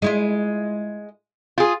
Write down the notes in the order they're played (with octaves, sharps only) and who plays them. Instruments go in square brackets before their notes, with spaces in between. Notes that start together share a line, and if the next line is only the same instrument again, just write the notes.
[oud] G#3 E4 F4
[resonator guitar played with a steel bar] F4 G#4